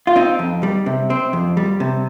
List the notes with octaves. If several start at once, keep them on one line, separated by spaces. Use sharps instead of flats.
F4
C4 D#4
F2
G3
C3
C4
F2
G3
C3